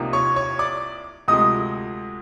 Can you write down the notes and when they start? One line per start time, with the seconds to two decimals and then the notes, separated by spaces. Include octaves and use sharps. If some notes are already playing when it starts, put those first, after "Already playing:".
Already playing: C2 C3 F3 A#3 D#4
0.13 C#5 C#6
0.36 C#5 C#6
0.59 D5 D6
1.28 D2 C3 F3 G#3 D#5 D#6